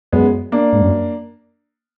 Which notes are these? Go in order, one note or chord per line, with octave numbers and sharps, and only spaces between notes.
F#2 G#3 B3
A#3 D4
G#2
F#2